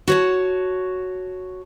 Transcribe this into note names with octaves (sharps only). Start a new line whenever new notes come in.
F#4 C#5 A5